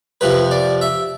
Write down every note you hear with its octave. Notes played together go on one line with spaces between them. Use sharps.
F2 C3 F3 B4
D5
E5